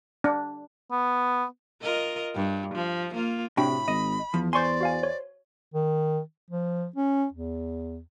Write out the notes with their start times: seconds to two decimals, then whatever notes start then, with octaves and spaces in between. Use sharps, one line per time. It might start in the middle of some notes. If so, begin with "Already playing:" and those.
0.24 D4
0.91 B3
1.82 F4 A#4 D#5
2.34 G2
2.75 F3
3.14 A#3 F4
3.57 A2 C3 D4 F#4 G5 B5
3.88 G#1 D#5
4.34 E2 F3
4.53 C5 D5 G#5 C6 C#6 G6
4.81 F#4 F5 G#5
5.03 C#5
5.74 D#3
6.50 F3
6.96 C#4
7.32 E2